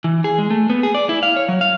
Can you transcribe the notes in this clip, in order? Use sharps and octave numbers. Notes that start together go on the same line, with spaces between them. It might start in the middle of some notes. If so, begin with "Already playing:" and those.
E3
G#4
G#3
A3
B3
G#4
D5
E4
F5
C#5
F#3
F5